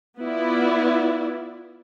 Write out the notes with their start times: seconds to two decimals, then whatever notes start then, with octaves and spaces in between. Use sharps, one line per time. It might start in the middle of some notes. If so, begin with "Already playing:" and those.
0.20 B3 E4 F4 D5